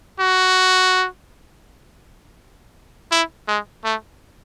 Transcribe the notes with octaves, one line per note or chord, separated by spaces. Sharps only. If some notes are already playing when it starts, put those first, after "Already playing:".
F#4
E4
G#3
A3